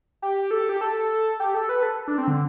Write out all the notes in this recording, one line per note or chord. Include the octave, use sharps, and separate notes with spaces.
G4
A4
G4
A4
G4
A4
B4
A4
D4
C4
D3